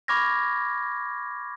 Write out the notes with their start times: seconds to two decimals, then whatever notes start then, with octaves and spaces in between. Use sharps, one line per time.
0.08 B5 C#6 D6 F6 G#6 A#6